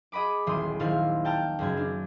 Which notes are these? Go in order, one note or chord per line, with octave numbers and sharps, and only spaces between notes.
G#4 D#5 F#5 B5 D6
D#1 B1 E3 C6 D#6 D#7
D#1 A#1 D#3 E4 F5 A6
G5 A5 A#5 F6
C#2 F#2 G#6
D4